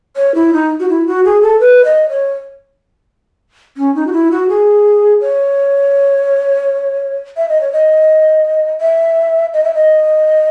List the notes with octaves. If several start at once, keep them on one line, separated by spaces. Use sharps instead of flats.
C#5
E4
D#4
F#4
E4
F#4
G#4
A4
B4
D#5
C#5
C#4
D#4
F#4
E4
F#4
G#4
C#5
E5
D#5
C#5
D#5
E5
D#5
E5
D#5